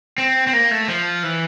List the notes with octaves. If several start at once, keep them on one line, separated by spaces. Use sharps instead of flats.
C4
C4
A#3
A3
F3
E3